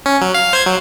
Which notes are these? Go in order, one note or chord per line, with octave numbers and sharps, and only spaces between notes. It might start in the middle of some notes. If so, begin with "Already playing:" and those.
C#4
F#3
F5
C5 G#6
F#3